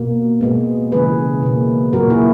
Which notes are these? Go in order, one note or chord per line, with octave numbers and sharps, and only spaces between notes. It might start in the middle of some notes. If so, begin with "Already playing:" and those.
Already playing: B2 A#3
B2 G#3 B3
C#3 E3 G#3 G#4 B4
B2 A#3
A#2 F#3 A#3 F#4 A#4
E4 G#4